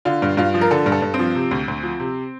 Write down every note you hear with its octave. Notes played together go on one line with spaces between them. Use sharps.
D3 F4
G2
G2 F4
F3
A#4
D3 A4
G2
A4
G2
C4
F3
C3
D2
D2
F3
C3